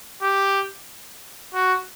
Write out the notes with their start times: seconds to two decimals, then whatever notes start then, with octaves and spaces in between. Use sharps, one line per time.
0.22 G4
1.54 F#4